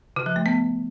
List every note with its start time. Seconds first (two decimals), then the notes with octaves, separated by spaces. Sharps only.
0.16 C#3
0.26 F3
0.36 A3
0.46 B3